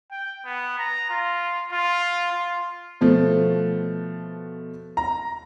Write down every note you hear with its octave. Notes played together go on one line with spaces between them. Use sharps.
G5
B3
A#5
F4
F4
F4
B2 F3 A3
A#5